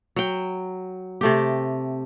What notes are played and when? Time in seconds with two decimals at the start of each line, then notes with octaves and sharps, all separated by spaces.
0.16 F#3 G5
1.21 C3 A3 G4